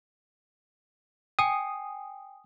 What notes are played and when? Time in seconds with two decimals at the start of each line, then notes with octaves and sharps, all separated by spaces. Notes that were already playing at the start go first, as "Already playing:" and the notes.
1.39 G5 G#5 D#6